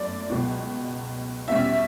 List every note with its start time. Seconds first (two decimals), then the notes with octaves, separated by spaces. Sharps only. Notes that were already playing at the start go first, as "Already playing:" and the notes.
Already playing: G1 F#2 A3 D5
0.30 C#2 B2 F#3
1.48 E2 B2 G3 C#4 E5